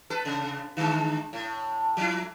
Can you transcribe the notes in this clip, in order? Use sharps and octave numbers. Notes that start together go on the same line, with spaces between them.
A4 B4
C3
D3 G#3
A2
F3 E4